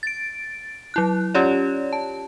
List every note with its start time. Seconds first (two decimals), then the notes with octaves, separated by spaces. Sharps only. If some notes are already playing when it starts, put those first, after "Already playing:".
0.03 A6 D7
0.94 F#3 E4 F#6
1.34 C#4 F4 G4 C#5 D5
1.93 A5